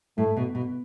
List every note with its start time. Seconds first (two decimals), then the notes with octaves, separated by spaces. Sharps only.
0.18 A2 A3
0.37 B2
0.55 B2